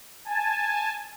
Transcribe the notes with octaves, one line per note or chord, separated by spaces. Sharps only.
G#5 A5